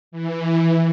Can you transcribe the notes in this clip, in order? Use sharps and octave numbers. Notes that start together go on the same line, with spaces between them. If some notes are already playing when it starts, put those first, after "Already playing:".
E3